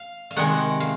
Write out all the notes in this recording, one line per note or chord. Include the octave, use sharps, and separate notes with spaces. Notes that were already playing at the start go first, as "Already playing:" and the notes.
Already playing: F5
F5
C3 D#3 G#3 F#5
F5